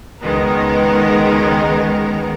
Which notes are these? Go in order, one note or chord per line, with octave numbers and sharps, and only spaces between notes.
C#2 D#3 G#3 B3 A#4